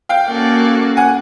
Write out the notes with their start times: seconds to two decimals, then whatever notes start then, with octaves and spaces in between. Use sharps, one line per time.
0.09 F5 G5
0.27 A#3 C#4 F#4 A4 D5
0.97 F#5 G#5